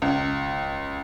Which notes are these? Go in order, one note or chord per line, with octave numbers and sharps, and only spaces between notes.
C#2